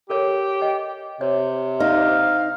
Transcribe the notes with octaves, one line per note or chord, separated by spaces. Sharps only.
G4 A4 A#4 C#5
D#5 G5
C3 C#5
D#4 F5